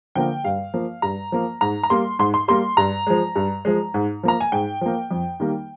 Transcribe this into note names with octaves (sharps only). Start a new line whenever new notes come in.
D3 F3 A#3 G5
G2 F5
F3 A#3
G2 A#5
F3 A#3
G#2 A#5
A#5
G3 A#3 C6
G#2 C6
C6
G3 A#3 C6
G2 A#5
F3 G#3
G2
F3 G#3
G#2
F3 A#3 A#5
G#5
G#2 G5
F3 A#3
F2
D#3 G3 A#3